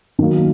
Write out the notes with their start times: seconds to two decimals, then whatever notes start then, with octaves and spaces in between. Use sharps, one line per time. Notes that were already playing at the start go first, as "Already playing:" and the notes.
0.19 D#3 F#3 A#3